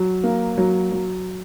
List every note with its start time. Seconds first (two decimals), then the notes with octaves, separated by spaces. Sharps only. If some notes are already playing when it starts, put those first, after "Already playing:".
Already playing: F#3
0.24 A#3
0.58 F#3
0.92 F#3